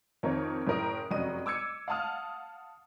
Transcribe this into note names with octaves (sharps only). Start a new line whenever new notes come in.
F2 D#3 D#4 A#4 C#5
F#1 A2 A#4 D#6
F1 F#2 F#3 F#4 D#5 D#7
D6 E6 G#6 C#7 D#7
F5 F#5 A5 D#6 F6